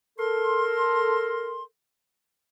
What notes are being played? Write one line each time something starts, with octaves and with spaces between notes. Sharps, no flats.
A4 A#4 C6